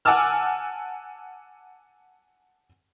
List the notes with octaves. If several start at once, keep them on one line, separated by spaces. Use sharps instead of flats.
F#5 G#5 A5 D6 E6 F6